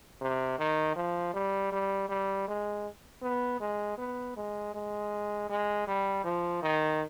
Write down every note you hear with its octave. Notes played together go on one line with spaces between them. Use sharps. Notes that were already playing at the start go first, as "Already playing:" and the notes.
C3
D#3
F3
G3
G3
G3
G#3
B3
G#3
B3
G#3
G#3
G#3
G3
F3
D#3